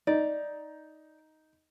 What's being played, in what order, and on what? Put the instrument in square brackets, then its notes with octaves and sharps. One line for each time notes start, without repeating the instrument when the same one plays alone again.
[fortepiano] D#4 [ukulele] D5